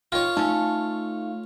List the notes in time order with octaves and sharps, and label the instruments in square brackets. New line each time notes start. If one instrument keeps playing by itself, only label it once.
[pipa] D#3 [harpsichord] F4 C#5
[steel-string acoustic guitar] A3 [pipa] C#4 A4 [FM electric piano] D#4 F5